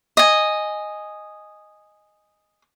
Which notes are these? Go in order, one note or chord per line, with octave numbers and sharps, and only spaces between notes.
D#5 G#5